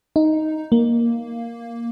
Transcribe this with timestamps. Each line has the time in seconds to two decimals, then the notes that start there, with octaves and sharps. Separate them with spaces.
0.16 D#4
0.72 A#3